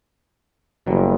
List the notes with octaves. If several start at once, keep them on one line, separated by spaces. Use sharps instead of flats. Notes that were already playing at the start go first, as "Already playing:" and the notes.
F#1 B2 F#3 G3